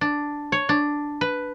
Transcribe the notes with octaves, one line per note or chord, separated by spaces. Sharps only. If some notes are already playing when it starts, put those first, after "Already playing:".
D4
C#5
D4
B4